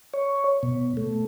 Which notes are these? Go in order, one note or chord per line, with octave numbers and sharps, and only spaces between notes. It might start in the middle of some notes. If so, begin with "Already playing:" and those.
C#5
B2
A3